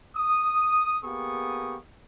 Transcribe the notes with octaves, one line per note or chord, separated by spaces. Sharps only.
D#6
A#3 B3 G4 G#4 C#6 D#6